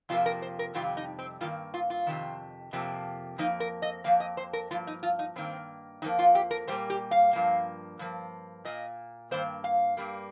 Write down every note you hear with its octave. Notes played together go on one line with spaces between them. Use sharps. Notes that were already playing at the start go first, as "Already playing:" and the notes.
F2 C3 F3 A#3 F4
A#4
C5
A#4
F2 C3 D#3 G3 F4
D#4
C4
G2 D#3 A#3 F4
F4
F4
F2 C3 D#3
F2 C3 F3 A#3
F2 F3 A#3 D#4
A#4
D#5
F2 F3 A#3 F5
D#5
C5
A#4
G2 F3 A#3 F4
D#4
F4
D#4
G2 D#3 A#3 C4
F2 F3 A#3 D#4
F4
G4
A#4
A#2 G3 A#3 C5
G4
F5
G2 F3 A#3
G2 F3 A#3
A#2 A#3 D#5
G2 D#3 A#3 C5
F5
G2 G3 A#3